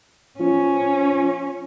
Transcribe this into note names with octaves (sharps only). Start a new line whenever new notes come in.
F3 C#4